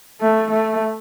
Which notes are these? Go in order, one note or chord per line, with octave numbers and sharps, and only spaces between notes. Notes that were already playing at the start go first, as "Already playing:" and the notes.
A3
A3